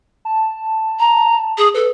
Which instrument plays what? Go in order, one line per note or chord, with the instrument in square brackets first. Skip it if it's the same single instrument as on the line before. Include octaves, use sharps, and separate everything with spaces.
[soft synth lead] A5
[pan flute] A#5
G#4
[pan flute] A4 [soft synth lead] B4